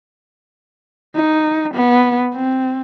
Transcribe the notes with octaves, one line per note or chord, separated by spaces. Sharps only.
D#4
B3
C4